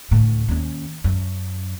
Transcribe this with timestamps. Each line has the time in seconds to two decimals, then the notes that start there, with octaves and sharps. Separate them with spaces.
0.11 D2 A2
0.48 D#2 C#4
1.04 F#2